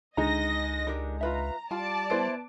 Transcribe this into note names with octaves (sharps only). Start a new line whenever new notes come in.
C#2 D3 G#3 D#4 D#5 A#5 A#6
D4 G4 A#4
F4 B4 E5 A#5
G3 F4 D5 A5
B3 E4 C5 D7